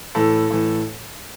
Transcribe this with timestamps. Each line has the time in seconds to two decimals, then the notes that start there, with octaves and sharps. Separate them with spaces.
0.15 A2 E3 A4
0.50 A2 E3